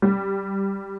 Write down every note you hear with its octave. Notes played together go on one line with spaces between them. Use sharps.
G3